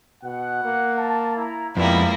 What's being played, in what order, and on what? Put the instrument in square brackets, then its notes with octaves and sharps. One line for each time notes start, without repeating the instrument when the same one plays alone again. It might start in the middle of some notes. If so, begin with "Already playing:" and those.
[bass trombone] B2 [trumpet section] F#5
[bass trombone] A#3
[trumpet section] A5
E4 A#5
[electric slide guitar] F2 [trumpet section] G3 [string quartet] G#3 A#3 E4 [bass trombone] B3